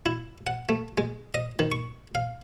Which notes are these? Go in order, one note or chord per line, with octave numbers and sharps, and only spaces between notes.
E4
F#5
A3
G#3
D#5
D#3
C#6
F5